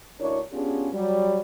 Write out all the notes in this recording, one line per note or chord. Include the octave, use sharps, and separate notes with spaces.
D2 D4 E4 A#4 C#5
B3 C#4 D4 F4 G4 G#4
F#3 G3